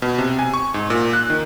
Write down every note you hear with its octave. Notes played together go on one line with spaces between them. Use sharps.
B2
C3
G#5
C#6
G#2
A#2
F#6
D#3